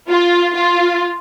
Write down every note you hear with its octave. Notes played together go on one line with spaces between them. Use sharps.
F4
F4